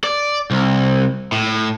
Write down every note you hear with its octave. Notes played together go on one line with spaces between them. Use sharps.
D5
C2
A2